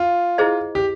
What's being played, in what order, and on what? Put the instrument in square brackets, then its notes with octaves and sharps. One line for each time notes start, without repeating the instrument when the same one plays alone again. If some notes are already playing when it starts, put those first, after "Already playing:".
Already playing: [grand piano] F4
[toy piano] E4 G#4 C5 D#5
[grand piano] G4